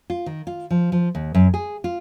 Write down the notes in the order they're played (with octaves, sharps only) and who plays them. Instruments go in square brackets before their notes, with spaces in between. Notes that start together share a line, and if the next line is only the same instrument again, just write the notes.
[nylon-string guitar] F4
D#3
F4
F3
F3
D#2
F#2
G#4
F4